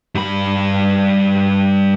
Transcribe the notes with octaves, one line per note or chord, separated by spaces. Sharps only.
G2 B5